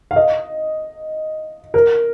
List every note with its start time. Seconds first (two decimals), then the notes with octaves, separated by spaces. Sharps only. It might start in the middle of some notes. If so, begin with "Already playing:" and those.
0.11 F5
0.16 D#5
1.74 A#4